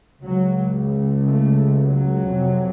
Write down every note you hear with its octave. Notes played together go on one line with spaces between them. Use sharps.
C#2 C#3 F#3
A3
F#3
F2 C3